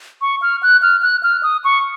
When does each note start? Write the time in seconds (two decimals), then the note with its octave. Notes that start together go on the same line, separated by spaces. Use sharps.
0.22 C#6
0.42 F6
0.63 F#6
0.82 F6
1.03 F#6
1.23 F6
1.43 D#6
1.64 C#6